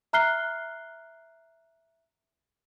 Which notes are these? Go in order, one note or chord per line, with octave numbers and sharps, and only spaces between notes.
E5 A#5 F6 F#6 C7 G7